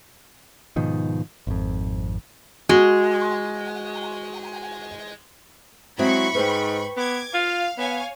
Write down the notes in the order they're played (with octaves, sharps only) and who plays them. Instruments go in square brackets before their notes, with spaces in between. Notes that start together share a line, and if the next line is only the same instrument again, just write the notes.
[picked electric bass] G#2 B2 D#3 F3
G#1 F2
[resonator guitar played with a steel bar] G#3 [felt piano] F#4
[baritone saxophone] F#3 [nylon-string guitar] G#3 C4 E4 [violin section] B5 C#6
[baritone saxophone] G#2 [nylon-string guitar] B4 C5 G5
[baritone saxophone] B3 [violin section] D6 G#6
[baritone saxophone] F4 [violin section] F5
[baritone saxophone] B3 [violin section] C#5 F5 G#5